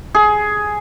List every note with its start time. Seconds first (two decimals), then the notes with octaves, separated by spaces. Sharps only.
0.15 G#4